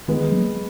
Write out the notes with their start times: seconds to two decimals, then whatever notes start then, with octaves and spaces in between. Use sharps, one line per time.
0.08 D#3 G#3 B3
0.32 F#3 A#3 C#4